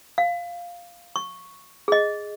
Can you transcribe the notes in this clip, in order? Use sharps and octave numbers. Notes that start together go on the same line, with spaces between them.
F5
C#6
G#4 D#5